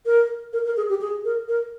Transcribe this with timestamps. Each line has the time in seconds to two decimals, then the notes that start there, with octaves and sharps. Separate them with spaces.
0.06 A#4
0.53 A#4
0.65 A#4
0.77 G#4
0.89 G4
1.01 G#4
1.25 A#4
1.48 A#4